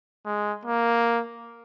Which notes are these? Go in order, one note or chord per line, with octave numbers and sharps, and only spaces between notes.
G#3
A#3